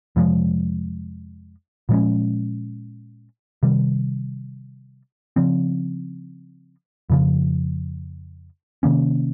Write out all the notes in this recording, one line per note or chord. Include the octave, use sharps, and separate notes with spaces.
F2 C3 F3 G#3
A#2 F3 G#3 C#4
C3 D#3 G3
C#3 F3 C4
F2 C#3 F3
C3 D#3 A#3 C#4